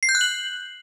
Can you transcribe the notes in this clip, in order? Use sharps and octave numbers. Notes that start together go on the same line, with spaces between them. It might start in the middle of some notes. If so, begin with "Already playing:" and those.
C7
G6
F#6
F#7